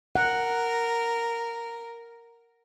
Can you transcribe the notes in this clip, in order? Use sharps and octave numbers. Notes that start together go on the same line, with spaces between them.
A#4 F#5